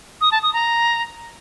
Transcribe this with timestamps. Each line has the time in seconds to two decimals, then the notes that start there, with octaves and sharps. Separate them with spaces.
0.21 D#6
0.32 A5
0.43 D#6
0.53 A#5